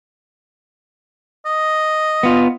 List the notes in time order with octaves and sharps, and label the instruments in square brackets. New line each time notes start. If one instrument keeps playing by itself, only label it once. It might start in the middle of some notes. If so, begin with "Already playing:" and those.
[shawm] D#5
[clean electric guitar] B3 F4